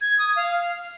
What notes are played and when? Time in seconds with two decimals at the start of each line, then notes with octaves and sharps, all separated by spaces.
0.01 G#6
0.19 D#6
0.36 F5